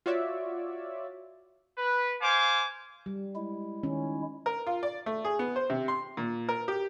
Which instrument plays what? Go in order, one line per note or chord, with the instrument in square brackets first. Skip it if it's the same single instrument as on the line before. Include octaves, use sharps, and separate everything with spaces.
[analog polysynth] F4 F#4 C#5 D5 E5
[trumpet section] B4
C5 F5 G#5 D6
[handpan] G3
[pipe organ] G#3 E4
[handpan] D#3 C#4
[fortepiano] A#4
F4
D5
A3
G#4
B3
C5
C3
C6
A#2
A#4
G4